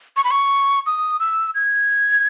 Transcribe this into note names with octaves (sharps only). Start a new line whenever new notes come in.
C#6
B5
C#6
D#6
E6
G#6